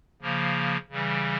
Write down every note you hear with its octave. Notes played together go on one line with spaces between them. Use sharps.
C#3 F3 A#3
C#3 E3 G3